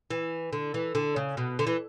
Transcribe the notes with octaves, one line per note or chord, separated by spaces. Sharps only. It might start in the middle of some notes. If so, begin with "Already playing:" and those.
E3
D3
E3
D3
C#3
B2
D3
E3